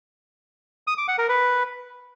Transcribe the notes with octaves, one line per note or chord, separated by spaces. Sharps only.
D#6
D6
F#5
A#4
B4